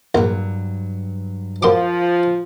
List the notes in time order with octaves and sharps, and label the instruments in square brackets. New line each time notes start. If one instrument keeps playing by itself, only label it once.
[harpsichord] A#1 [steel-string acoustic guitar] G2 F#3
[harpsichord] F#2 C6 D6 [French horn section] F3